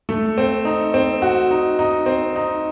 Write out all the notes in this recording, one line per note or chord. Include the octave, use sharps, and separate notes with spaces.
A3
C4
D#4
C4
F#4
D#4
D#4
C4
D#4